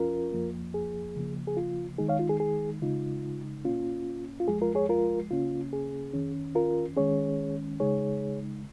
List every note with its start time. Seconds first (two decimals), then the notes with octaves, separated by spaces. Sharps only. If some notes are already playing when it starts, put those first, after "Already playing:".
Already playing: F2 F3 C#4 F4 A#4
0.32 F2 F3 A#3
0.74 G#4
1.16 C#3 F3 A#3
1.47 G#4
1.57 F4
1.98 D#3 G#3 D#4 G#4
2.08 C#5 F5
2.19 F4
2.29 G#4
2.40 G#4
2.82 C#3 G#3 D#4 F4
3.65 A#2 A#3 C#4 F4
4.40 F4
4.48 F2 F3 G#3 G#4
4.62 F4 A#4
4.75 G#4 C#5
4.89 F4 A#4
5.31 C#3 A#3 C#4 F4
5.73 G#4
6.13 F2 D#3 C#4
6.55 F4 A#4
6.96 D#3 G#3 C#4 G#4 C#5
7.80 C#3 G#3 D#4 G#4 C#5